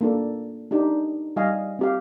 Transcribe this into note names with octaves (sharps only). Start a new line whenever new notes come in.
A#3 D4 A4
D4 D#4 G4
G3 D#5 F5 G#5
C4 G4 F5